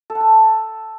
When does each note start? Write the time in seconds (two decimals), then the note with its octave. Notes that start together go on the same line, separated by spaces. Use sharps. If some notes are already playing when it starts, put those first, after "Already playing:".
0.10 A4
0.15 F#5
0.21 A5